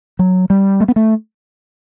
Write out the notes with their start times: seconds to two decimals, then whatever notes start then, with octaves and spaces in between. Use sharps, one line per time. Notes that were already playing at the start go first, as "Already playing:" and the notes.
0.19 F#3
0.50 G3
0.80 A3
0.88 B3
0.96 A3